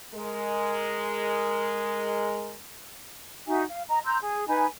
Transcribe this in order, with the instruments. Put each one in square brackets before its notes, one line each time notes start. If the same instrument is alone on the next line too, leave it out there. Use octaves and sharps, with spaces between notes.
[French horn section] G#3 A#4
[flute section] D#4 F#4 E5 G#5
F5
D#5 A#5
A#5 C6 E6 G6
G#4
D#4 B4 G#5 B5